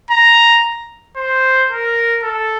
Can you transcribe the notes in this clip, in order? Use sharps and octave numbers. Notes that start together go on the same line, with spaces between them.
A#5
C5
A#4
A4